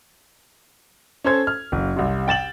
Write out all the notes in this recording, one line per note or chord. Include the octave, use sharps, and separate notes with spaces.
C#4 A4 C5 G#6
F6
F#1
C2 C3
G5 A6 E7 F#7